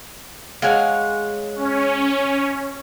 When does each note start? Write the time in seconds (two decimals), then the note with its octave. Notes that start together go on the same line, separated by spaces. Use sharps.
0.62 G#3 C#5 F5 F#5 G#5
1.56 C#4